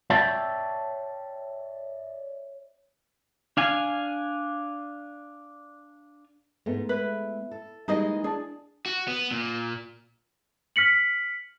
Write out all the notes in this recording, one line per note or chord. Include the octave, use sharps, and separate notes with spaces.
C#5 D5 E5 G5 A5
D4 F5 G#5
G#2 G#3 A3 B3
E4 B4
A4
E3 G3 G#3 A#3 D#4 G#4 D#5
D4 G#4 A5
F#4
B3
A#2
F6 B6 C#7 F#7